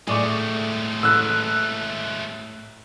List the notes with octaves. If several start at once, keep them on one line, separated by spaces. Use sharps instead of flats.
A2 G#3 A3 G#4 D5 C#6
A1 E6 F#6